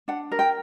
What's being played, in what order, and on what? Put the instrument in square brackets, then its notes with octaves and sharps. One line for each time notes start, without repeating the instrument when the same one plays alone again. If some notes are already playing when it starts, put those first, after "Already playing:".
[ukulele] D4 F#5
A#4
G5